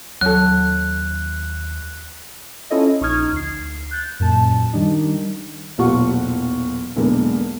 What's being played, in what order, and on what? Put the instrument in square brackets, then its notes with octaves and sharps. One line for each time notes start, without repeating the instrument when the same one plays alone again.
[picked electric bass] D#2 [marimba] F#3 [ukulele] C#4 A4 [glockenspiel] F#6
[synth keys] C#4 E4 F4 A4 C#5 D#5
A#1 D#4 C#6 D#6 F6 G#6
D2 C7
F#6 G6 A6
F#2 A#2 A5
D#3 G3 D4 D#4
[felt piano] E1 B1 A#2 F4 F#5 C#6
B1 E2 D3 G#3 A#3